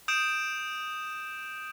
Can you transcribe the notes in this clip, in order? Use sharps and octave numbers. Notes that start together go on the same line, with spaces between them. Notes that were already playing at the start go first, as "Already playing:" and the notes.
D#6 G6 D7 E7